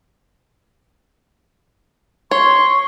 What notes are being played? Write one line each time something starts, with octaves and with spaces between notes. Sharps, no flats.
C#5 C6 C#6